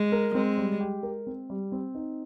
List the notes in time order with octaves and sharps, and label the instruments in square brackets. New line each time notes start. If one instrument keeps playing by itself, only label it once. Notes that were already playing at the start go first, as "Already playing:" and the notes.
Already playing: [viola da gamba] G#3
[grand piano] A#4
[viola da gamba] G#3 [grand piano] C4
[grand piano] G3
G4
A#4
C4
G3
C4
D#4